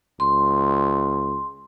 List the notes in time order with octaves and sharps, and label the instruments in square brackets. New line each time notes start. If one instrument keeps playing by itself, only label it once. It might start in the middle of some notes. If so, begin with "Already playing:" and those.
[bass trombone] C#2 [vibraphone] C6